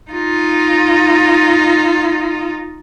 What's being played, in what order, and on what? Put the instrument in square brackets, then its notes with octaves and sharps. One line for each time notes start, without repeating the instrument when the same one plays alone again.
[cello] D#4 F4